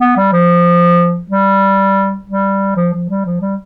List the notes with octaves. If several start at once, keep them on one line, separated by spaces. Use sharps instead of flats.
B3
G3
F3
G3
G3
F3
F3
G3
F3
G3